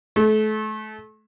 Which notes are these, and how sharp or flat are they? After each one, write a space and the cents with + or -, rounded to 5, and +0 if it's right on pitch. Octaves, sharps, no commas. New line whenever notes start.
A3 -35